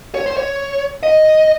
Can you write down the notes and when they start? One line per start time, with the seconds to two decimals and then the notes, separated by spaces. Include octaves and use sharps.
0.15 C#5
0.26 C5
0.37 C#5
1.03 D#5